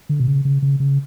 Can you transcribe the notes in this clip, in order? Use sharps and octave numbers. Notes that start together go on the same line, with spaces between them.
D3
B2
C#3
C#3
C#3
C#3